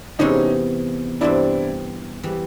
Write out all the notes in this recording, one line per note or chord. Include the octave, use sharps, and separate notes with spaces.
E2 C3 E3 A3 C#4 D#4
G2 E3 G3 C4 D4 E4
E3 G3